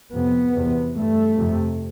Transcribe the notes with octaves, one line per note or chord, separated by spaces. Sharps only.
F2 C3 B3
E2 C3
G2 A3
F2 C3